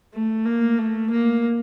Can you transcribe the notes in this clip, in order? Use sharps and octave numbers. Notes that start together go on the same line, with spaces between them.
A3
A#3
A3
A#3